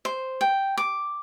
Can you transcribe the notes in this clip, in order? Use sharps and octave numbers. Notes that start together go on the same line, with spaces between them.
C5
G5
D6